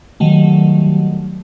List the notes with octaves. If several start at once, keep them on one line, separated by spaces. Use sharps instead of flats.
D#3 F#3 G3 A3